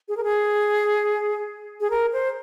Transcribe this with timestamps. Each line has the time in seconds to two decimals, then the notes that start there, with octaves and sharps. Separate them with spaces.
0.08 G#4
0.17 A#4
0.24 G#4
1.80 G#4
1.90 A#4
2.13 C5